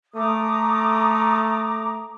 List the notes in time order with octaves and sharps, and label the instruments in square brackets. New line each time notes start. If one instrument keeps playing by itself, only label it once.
[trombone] A3 [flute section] A#5 D6 D#6